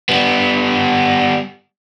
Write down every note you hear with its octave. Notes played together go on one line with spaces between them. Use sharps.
G3 B3